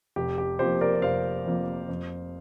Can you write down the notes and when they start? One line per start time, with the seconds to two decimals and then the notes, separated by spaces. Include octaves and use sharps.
0.16 F1 G4
0.38 G4
0.59 F2 F3 A#3 G4 C5
0.81 A#4 D5
0.95 D5
1.02 F1 C5 F5
1.46 F2 F3 A#3
1.89 F2